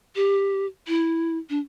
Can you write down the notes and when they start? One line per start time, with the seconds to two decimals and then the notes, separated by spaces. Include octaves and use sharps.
0.16 G4
0.88 E4
1.50 D4